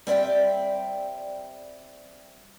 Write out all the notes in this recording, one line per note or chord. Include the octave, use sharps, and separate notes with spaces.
G3 C4 D5 E5 G5